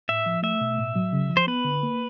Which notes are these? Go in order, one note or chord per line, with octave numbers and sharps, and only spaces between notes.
A2 E5
F3
A3 E5
B2
A2
F#3
C#3
F3
C5
B3 B4
D3
A#3